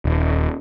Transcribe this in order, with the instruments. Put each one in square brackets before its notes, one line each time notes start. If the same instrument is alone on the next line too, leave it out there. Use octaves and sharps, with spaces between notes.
[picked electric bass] D#1